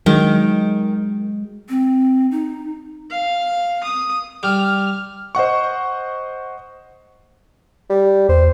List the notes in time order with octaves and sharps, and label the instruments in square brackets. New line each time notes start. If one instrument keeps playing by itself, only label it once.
[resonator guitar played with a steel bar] D#3 [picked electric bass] F#3 G#3
[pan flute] C4
D#4
[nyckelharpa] F5
D#6
[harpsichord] G3 [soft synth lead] F6
[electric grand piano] C5 D#5 F#5 C#6
[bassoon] G3
[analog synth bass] E2 [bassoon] C5